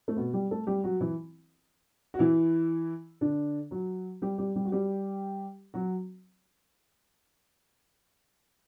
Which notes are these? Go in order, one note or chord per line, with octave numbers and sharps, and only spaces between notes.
A3
B2 B3
G3 G4
A3 A4
G3 G4
F#3 F#4
E3 E4
F#4
E3 E4
D3 D4
F#3 F#4
G3 G4
G3 G4
G3 G4
F#4
G3 G4
F#3 F#4